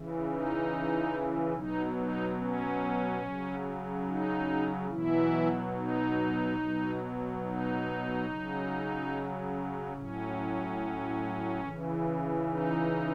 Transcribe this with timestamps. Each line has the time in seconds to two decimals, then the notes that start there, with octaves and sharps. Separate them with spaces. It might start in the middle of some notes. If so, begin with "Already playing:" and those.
Already playing: C#3 E3
0.27 D#4
1.53 B2 F#3 D#4
1.96 D#4
2.38 C#4
3.22 C#3 F#3
4.05 D#4
4.89 B2 E3 F#3 E4
5.74 D#4
6.57 B2 F#3
7.41 D#4
8.25 C#3
8.30 F#3
9.93 A2 F#3 C#4
11.61 C#3 E3
12.46 D#4